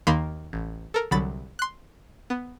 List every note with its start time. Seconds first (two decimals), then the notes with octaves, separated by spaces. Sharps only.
0.07 D#2 D#3 A#3 B5 C6
0.53 A1
0.94 A4 A#4
1.11 C2 D3 F#3 B5 A6
1.59 C6 F#6
2.30 B3